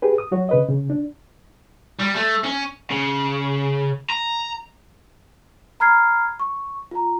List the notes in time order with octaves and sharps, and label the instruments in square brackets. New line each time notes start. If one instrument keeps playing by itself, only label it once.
[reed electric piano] G4 G#4 B4
D#6
F#3 F#4 C#5
C#3 B4 D#5
C#3
D4
[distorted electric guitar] G3
A3
C#4
[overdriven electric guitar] C#3
A#5
[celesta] A#5 B5 F6 G#6 C7
C#6
F4 A#5